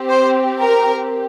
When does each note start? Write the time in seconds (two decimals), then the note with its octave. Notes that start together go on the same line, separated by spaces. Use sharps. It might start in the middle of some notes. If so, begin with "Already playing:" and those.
Already playing: C4 G4
0.09 C5
0.62 A#4